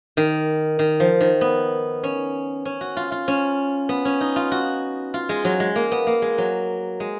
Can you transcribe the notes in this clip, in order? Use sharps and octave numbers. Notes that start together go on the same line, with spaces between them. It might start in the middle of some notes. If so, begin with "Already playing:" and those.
D#3
D#3
F3
D#3
B3
C#4
C#4
F#4
F4
F4
C#4
B3
C#4
D#4
F4
F#4
F4
G#3
F#3
G#3
A#3
B3
A#3
G#3
F#3
G#3